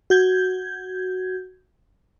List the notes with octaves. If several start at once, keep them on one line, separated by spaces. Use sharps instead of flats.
F#4 G6 G#6